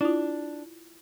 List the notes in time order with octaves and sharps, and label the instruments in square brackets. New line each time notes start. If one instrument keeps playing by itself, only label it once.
[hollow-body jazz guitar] D4 [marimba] E4 F4